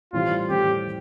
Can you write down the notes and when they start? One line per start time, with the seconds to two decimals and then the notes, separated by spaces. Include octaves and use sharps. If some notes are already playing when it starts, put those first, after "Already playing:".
0.13 A2 E3 G3 C4 F4
0.49 A2 E3 G3 C4 G4